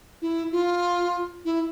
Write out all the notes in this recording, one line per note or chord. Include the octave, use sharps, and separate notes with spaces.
E4
F4
E4